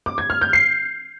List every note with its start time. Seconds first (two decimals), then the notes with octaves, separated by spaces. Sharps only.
0.06 D6
0.18 G#6
0.30 F6
0.41 G6
0.53 C7